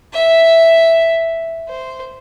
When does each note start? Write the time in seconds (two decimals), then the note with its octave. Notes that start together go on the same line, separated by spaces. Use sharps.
0.13 E5
1.68 C5